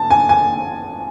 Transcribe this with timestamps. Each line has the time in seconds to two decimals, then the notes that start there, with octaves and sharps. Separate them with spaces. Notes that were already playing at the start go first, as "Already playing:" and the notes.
Already playing: A5
0.10 G#5
0.29 G#5